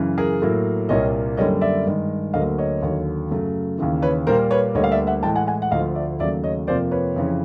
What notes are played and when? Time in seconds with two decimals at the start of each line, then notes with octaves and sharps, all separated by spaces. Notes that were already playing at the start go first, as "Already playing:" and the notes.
Already playing: F#2 C#3 E3
0.18 G#4 A#4
0.42 A2 F#3 A#3
0.89 C2 A#2 G3 A#3 C#5 D#5
1.37 F#2 D3 G3 A#3 C#5 D#5
1.61 D5 E5
1.87 G2 D#3 G#3
2.34 D2 D3 F#3 A#3 D#5 F5
2.58 C#5 D#5
2.82 D#2 D3 F#3
3.31 F#2 C#3 F#3 A3
3.78 D#2 C#3 E3
4.02 B4 C#5
4.27 A#2 G3 A#3 A#4 C5
4.51 B4 C#5
4.75 D2 D3 G3 A#3 C#5 D#5
4.84 F5
4.91 D5 E5
5.07 E5 F#5
5.23 A2 E3 G#3 G5 A5
5.35 F#5 G#5
5.47 F#5 G#5
5.62 F#5
5.71 D2 D3 F3 A3 D#5 F5
5.95 D5 E5
6.20 D#2 C#3 F#3 A3 D5 E5
6.44 C#5 D#5
6.67 F2 C3 F3 A#3 C5 D5
6.91 B4 C#5
7.16 F2 C#3 E3